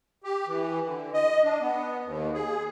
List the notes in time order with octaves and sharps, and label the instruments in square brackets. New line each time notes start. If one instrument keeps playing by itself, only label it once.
[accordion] G4
E3
D3
D#5
D4
B3
D#2
G#4